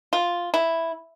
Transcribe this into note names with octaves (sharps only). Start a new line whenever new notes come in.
F4
E4